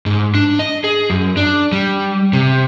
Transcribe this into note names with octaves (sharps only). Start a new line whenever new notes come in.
G#2
D4
D#5
G#4
F#2
D4
G3
C3